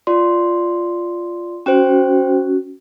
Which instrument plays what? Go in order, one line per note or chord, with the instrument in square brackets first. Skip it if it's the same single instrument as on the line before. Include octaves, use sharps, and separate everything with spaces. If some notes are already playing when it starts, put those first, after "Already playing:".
[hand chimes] F4 D5 C6
[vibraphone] C#4 F#4 [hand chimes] C5 G5